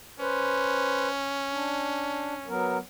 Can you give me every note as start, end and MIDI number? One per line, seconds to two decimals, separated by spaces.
0.20 2.52 61
0.20 1.08 71
0.20 1.08 72
1.52 2.34 62
2.47 2.78 54
2.47 2.78 59
2.47 2.78 70